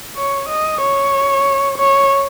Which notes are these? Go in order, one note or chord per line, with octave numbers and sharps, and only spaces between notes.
C#5
D#5
C#5
C#5